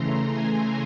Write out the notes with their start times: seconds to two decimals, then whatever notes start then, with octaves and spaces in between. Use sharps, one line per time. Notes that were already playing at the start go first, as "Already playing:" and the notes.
Already playing: C#3 E3 A3 A#5 C6
0.31 G#5